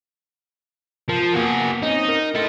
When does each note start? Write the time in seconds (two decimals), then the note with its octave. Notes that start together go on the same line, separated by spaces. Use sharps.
1.09 F3 A#4
1.34 A#3 B3 F#4 G#4
1.83 C4 C#4 D#4
2.09 A#4
2.35 E4 A4 D#5 C6 F6